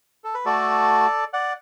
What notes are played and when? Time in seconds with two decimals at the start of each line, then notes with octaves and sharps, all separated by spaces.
0.24 A4
0.34 B4
0.45 A3 F#4 A4 D5
1.33 D5 F#5